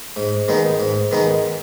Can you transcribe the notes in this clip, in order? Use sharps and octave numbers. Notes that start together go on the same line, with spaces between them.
G#2
D#3 G#3 B3 D#4
G#2
D#3 G#3 B3 D#4